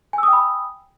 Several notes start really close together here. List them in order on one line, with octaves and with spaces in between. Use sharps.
G#5 E6 D#6 G5 B5